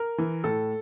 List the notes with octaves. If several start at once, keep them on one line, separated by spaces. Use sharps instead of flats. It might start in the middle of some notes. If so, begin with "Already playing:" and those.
Already playing: A#4
E3
A2 A4